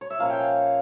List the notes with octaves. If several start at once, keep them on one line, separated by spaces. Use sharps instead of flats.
C#5
E5
A#2 F3 A#3 C#4 F5
G5
G#5